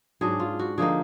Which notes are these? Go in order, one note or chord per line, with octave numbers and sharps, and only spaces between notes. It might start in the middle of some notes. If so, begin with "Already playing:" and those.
G#2 F#3 D4 G#4
F4
F#4
D3 F3 A#3 D#4 G#4